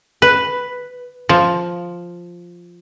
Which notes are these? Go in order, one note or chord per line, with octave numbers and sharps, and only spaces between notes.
B4
F3